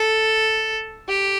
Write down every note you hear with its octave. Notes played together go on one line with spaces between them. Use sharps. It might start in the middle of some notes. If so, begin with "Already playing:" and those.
Already playing: A4
G4